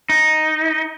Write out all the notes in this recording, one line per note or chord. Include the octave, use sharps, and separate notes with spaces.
D#4